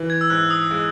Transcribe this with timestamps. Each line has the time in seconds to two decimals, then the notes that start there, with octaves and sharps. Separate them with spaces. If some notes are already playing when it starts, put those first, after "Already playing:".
Already playing: E3
0.10 G#6
0.21 E6
0.30 G#2 F#6
0.50 D#6
0.71 G#3